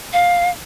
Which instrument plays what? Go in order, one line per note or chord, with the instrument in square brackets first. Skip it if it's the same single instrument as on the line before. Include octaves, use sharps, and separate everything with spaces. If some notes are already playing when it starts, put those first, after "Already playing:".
[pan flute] F5